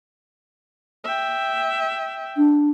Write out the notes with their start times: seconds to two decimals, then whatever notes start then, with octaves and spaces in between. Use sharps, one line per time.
1.04 E5 G5
2.37 D4